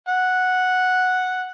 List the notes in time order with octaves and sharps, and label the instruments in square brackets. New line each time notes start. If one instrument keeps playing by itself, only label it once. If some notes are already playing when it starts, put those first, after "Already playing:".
[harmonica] F#5